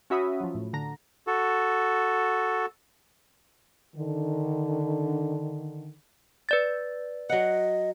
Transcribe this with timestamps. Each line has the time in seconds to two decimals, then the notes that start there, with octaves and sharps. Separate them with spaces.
0.10 C#4 F#4 E5 B5 D#6
0.40 F3 F#3
0.55 A2
0.73 D3 A#5
1.27 F#4 A4
3.96 D3 D#3
6.49 B4 D5 A6
7.29 F#3 D#5 F#5